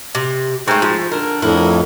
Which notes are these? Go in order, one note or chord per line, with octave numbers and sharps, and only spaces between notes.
C3
G#2 A3 C4
F3
D3 A#4
F2 A2 E4 A#4